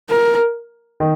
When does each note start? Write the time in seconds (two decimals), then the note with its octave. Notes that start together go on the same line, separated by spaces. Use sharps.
0.10 A#4
1.00 D#3